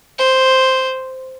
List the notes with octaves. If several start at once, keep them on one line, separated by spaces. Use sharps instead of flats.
C5